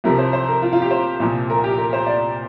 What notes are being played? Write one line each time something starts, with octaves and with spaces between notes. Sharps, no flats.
C2 C3 F3 A#4
C5
C5
A#4
F4
F4
G4
C5
C2 A#2 F3
A#4
G4
A#4
C5
D5